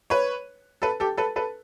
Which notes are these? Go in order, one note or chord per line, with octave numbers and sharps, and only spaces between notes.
B4 C#5
A4 B4
G4 A4
A4 B4
A4 B4